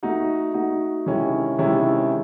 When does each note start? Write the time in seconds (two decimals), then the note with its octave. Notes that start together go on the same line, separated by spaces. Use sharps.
0.03 A3 D#4 F#4
0.54 A3 D#4 F#4
1.06 C3 D#3 G#3 C#4 E4
1.58 C3 D#3 G#3 C#4 E4